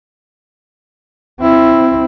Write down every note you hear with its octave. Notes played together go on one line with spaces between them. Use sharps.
C4 E4